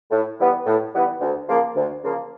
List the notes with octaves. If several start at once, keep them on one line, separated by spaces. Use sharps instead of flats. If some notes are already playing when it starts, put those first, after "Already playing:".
A2
E3 G3 B3
A2
E3 G3 B3
D2
C#3 F3 A#3
D2
C#3 F3 A#3